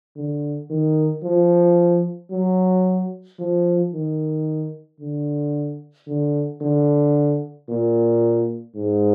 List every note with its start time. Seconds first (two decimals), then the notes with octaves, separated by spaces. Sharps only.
0.16 D3
0.70 D#3
1.23 F3
2.31 F#3
3.39 F3
3.93 D#3
5.00 D3
6.08 D3
6.62 D3
7.69 A#2
8.76 G#2